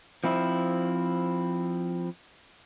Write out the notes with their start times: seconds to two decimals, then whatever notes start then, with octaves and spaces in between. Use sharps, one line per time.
0.24 F3 C4 E4